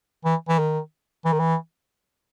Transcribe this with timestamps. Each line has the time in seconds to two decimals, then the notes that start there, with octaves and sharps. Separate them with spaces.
0.25 E3
0.49 E3
0.59 D#3
1.25 E3
1.33 D#3
1.39 E3